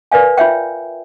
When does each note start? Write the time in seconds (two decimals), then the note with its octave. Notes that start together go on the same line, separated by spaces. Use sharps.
0.12 A#4 B4 D5 F5 G#5
0.38 F4 C#5 E5 G5